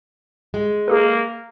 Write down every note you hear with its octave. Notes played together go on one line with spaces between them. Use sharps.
G#3
A#3 G#4 A4 B4